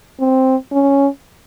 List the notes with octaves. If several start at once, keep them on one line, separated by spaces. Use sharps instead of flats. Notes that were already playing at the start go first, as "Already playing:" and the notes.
C4
C#4